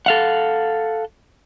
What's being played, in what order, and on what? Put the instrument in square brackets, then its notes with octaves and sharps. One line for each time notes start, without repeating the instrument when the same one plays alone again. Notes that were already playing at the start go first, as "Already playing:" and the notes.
[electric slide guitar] A4 F5 F#5